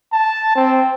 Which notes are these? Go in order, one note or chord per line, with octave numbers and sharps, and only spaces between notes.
A5
C4